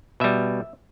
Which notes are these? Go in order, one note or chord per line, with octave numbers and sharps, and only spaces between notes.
B2 G3 E5